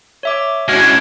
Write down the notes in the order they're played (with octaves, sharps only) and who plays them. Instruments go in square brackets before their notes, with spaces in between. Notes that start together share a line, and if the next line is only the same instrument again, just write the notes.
[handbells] C#5 E5 D6
[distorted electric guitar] G#3 D4 [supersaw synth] C#4 E4 F#4 [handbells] F6 [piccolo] G#6